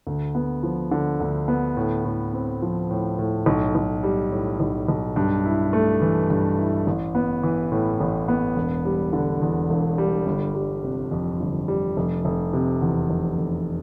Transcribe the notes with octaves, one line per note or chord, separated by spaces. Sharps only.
D2
B3
F3
D3
D2
B3
A2
A2
C4
F3
A2
A2
B1
B1
G3
A2
B1
B1
G2
E4
A3
E3
G2
E4
A1
B3
E3
A2
A1
B3
E1
G3
D3
E2
E1
G3
G1
G3
C3
F2
G1
G3
F1
F1
C3
E2
F1
F1